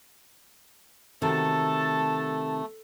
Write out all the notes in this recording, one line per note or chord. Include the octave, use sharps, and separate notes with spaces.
C3 D#3 A3 F#4 A4 A5